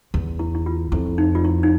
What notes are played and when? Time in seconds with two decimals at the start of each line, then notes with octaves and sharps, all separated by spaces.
0.14 E2
0.39 E4
0.55 E4
0.66 F4
0.92 F2 E4
1.18 D#4
1.35 F4
1.44 E4
1.63 D#4